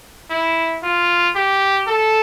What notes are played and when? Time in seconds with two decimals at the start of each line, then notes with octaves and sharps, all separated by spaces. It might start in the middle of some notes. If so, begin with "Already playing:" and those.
0.30 E4
0.83 F4
1.35 G4
1.88 A4